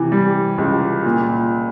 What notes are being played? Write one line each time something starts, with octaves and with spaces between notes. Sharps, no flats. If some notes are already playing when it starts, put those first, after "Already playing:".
Already playing: C3 E3
G3
C#2
A#2